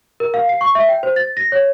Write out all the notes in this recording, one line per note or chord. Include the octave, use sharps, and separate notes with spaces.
A#4
F5
C7
C#6
E5
G5
C5
A6
A#6
C#5